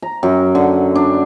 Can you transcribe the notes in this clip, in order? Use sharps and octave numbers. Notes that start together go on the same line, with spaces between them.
A#5
F#2
D3
D4